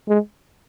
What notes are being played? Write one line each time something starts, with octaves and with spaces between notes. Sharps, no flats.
G#3